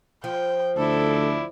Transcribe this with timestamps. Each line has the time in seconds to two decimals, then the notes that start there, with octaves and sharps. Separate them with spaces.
0.24 F3 G5
0.77 D2 E4 A4 D5